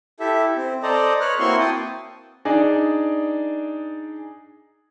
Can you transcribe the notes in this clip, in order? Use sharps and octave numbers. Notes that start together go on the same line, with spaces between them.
E4 G4 A4 E5
C4
A4 C5 D5 D#5 A#5
B4 C#5 F6 F#6
A#3 C4 E4 F#4 C6 C#6
G5 A5 D#6
D4 D#4 G#4 D5